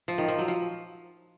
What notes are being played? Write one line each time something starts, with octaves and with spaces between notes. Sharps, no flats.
F3
D#3
F3
F#3
F3